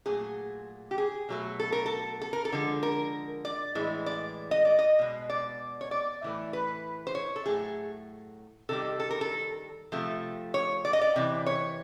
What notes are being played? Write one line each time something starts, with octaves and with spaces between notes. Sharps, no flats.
A#2 F#3 A3 G#4
G4
G#4
B2 F#3 A3
A4
A#4
A4
A4
A#4
A4
D3 F3 G#3
A#4
D5
A2 E3 G#3
D5
D#5
D5
D#5
B2 G#3
D5
C#5
D5
A2 E3 A3
B4
C5
C#5
A4
A2 F#3 A3 G#4
C3 D#3 G3 A4
A4
A#4
A4
C3 F3 A3
C#5
D5
D#5
D5
C3 E3
C#5